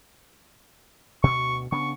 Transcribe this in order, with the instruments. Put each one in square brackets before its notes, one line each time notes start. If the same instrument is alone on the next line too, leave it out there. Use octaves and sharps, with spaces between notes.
[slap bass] D2 B2 [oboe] C#6
[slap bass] C#3 B3 D4 [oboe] C#6